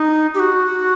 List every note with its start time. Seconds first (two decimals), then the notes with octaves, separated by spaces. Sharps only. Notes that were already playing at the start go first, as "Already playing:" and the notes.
Already playing: D#4
0.35 G4
0.39 F#4